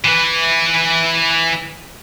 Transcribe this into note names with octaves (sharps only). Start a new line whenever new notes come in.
E3 B4